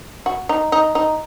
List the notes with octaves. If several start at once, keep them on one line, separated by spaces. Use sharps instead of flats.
F#4
D#4
D#4
D#4